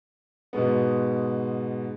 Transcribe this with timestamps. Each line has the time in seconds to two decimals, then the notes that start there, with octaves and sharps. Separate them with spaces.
0.53 G#2 B2 G#3 B3